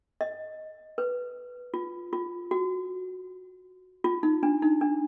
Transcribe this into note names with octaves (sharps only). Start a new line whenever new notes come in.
D#5
B4
F4
F4
F#4
F4
D#4
D4
D#4
D4